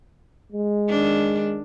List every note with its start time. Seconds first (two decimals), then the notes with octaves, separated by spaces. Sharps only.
0.52 G#3
0.88 D#3 D4